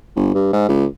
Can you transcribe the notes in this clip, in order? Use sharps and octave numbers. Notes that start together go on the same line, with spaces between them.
G1
G2
G#2
C#2